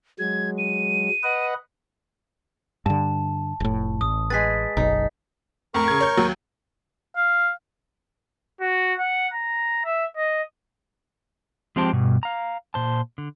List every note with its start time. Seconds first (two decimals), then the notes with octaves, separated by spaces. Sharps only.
0.19 F#3 G#3 G#6
0.58 D#7
1.23 B4 D#5 F#5
2.86 G2 D3 A5
3.60 F1 A2
4.01 A1 D#6
4.30 G#3 G#4 B4 A6 B6
4.77 F#1 B1 D#4
5.74 F2 A2 A#4 C#6
5.88 C#3 G#6
6.01 C#5 G6
6.17 D#2 F#3
7.17 F5
8.60 F#4
8.99 F#5
9.33 A#5
9.85 E5
10.17 D#5
11.76 F3 G#3 C4 G4 C5 A5
11.93 G2 B2
12.23 F5 A#5
12.74 A#2 C5 A5
13.18 D3